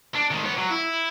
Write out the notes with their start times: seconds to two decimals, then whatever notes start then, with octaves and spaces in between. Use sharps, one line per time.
0.15 D4
0.31 D#3 G#3
0.45 B3 C#5
0.58 F#3
0.71 E4